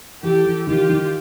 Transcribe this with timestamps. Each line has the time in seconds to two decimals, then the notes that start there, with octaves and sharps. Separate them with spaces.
0.23 E3 G4 A4
0.45 E3
0.67 D#3 F4 G4
0.89 D#3